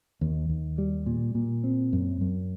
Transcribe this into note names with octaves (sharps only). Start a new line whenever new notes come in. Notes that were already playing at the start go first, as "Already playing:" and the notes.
D#2
D#2
G3
A#2
A#2
C4
F#2
F#2